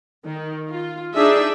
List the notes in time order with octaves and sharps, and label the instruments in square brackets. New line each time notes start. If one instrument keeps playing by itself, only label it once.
[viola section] D#3
F4
D4 D#4 G#4 E5